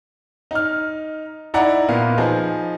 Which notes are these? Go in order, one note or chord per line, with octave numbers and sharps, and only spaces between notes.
D#4 F6
D#4 E4 D5 F#5 A#5
A#2 A#3 B3 F5
F3 D#4 G#4